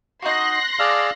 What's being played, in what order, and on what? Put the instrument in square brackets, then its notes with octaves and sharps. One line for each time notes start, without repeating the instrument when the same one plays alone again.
[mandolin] D#4 F#4 [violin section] C6 F#6 A#6
[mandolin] D4 [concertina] G#4 D5 [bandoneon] F5 E6 F6